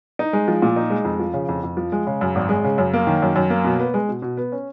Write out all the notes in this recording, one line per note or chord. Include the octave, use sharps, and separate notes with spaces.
D#4
G#3
F3
A#2
D#4
G#3
F2
F3
C#3
F2
F2
F3
G#3
C#3
F#2
G#1
G#3
C#3
F#2
A#3
D#3
F#2
F#2
A#3
B2
B3
G#3
B2
B2
B3
C#4